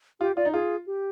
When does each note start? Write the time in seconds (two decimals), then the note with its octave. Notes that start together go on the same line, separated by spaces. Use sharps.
0.20 F4 G4
0.37 F4 D5
0.45 D#4
0.54 F4 G#4
0.86 G4